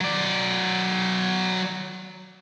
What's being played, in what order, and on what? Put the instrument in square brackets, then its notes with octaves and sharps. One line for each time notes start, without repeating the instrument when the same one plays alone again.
[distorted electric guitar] F#3 D5